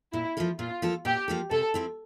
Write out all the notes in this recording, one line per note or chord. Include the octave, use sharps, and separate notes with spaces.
A#2 E4
F3 A#3 F4 A4
A#2 F4
F3 A#3 F4 A4
A#2 G4
F3 A#3 F4 A4
C3 A4
F3 C4 E4